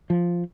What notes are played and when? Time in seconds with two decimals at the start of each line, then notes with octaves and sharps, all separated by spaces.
0.10 F3